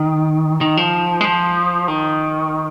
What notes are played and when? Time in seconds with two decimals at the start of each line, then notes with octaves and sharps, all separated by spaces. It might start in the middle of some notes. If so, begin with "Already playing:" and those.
Already playing: D#3
0.61 D#3
0.77 F3
1.21 G#3
1.25 F3
1.88 D#3